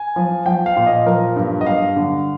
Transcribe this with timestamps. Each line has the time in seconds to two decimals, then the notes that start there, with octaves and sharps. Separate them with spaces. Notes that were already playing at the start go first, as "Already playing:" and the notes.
Already playing: G#5
0.16 F3
0.46 F3 G5
0.66 F5
0.76 A#2
0.86 D#5
1.06 F3 A#4
1.36 G2
1.61 D#5
1.66 G2 F5
1.96 D3